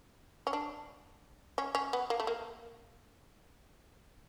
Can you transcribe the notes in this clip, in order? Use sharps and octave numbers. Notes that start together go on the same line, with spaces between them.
C#4
D4
C#4
C#4
B3
A#3
A3
A#3